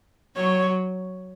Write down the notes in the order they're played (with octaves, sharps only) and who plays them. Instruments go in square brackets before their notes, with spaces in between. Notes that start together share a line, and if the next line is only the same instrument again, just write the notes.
[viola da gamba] F#3 [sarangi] C#5